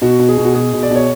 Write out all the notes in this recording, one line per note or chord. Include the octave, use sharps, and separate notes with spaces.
B2 F#4
B2
G#4
B2
F#4
B2 G#4
B2
D5
B2
C#5